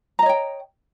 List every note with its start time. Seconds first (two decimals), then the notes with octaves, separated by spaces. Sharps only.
0.19 A#5
0.22 D#5
0.26 C#5
0.29 G5